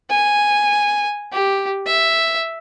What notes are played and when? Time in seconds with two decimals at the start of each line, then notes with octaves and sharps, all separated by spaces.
0.10 G#5
1.32 G4
1.86 E5